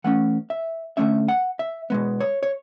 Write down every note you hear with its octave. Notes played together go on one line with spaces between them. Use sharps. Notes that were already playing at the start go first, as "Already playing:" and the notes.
E3 A3 C#4 F#5
E5
D3 A3 C#4 E5
F#5
E5
B2 G#3 B3
C#5
C#5